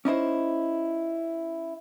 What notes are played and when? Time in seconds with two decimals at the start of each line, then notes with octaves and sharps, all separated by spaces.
0.05 C#4 D#4 E4 C5